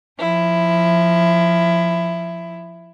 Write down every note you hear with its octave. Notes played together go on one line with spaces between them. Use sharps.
F3 E4